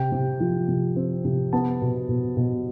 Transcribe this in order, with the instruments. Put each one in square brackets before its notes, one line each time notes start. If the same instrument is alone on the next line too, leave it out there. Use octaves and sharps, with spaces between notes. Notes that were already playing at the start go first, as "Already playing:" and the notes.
Already playing: [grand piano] C3 G5
C3
F3
C3
C4
C3
B3 A5
B2
B2
B2